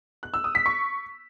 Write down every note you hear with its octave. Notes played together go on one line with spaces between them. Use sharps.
F#6
E6
D#6
B6
C#6